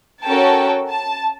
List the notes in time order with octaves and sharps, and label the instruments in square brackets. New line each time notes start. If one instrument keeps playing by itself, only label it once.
[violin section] C#4 F#4 A4 A#4 G5 A5
A5